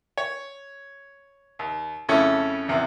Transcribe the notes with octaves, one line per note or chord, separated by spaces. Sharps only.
C#5
D#2
F2 C#3 A3 C#4 E4
A#1 E2 C3